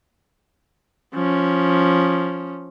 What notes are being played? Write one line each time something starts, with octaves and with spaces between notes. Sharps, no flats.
F3 C#4